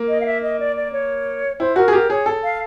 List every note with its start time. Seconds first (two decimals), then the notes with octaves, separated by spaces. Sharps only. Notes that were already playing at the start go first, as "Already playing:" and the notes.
Already playing: A#3
0.09 D#5
0.21 F5
0.26 E5
0.42 D#5
0.60 D5
0.76 D5
0.92 C#5
1.60 E4 C5
1.76 F#4 A#4
1.88 G#4
1.93 G4 A#4
2.10 G#4 C#5
2.26 A4
2.44 F5